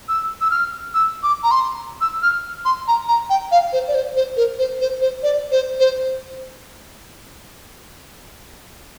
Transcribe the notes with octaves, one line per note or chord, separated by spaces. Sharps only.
E6
E6
F6
E6
D6
A#5
C6
E6
F6
C6
A#5
A#5
G5
F5
C5
D5
C5
C5
A#4
C5
C5
C5
D5
C5
C5